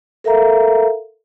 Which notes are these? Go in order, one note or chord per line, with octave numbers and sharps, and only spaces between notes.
A4 A#4 E5 F5 A#5